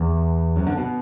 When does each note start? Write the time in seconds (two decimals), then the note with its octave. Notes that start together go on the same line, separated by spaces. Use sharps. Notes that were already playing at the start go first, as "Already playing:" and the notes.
Already playing: E2
0.56 F#2
0.67 D3
0.78 B2